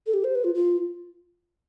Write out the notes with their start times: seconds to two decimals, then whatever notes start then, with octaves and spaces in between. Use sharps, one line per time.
0.07 A4
0.14 G4
0.24 C5
0.35 B4
0.44 F4
0.54 F4